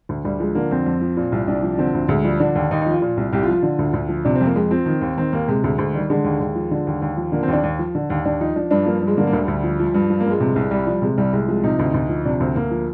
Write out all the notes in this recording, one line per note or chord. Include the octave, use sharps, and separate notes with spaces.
D2
D2 G3
F3 G#3
D3 A#3
F2 C4
F2
F3
A#2
C2
C2 D4
F3
D3 C4
D2
D2 G#3
F3 G3
D3 D4
D#2
D#2 D#4
D#4
F3 F4
A#2
C2
C2 G4
F4
F3
F4
D3
D2
D2
F3
C3 D4
C4
F2 A#3
F2 G#3
F3 C4
D#3
D#2
D#3 C4
D#2 A#3
C3 G#3
D2 G#3
D2 G#3
D#3 G3
D3 G#3
D#2
D#2
F3
D3
D#2
D#2
F3
D3 A#3
C4
D#2 D4
D#2
F3
D3
D#2
D#2 D4
F3 D#4
F3 D4
G2 D4
F3 A#3
G2
G#3
D3 A#3
A#3
D2
G3
D2
F3
F3
G2
F3
A#3
G2
G#3
C3
C2
C2 G3
F3 G3
C3 G#3
C2 G3
C2 G#3
F3 G#3
C3 D#4
D2
D2
F3
C3 D4
D2 C4
D2 A#3
F3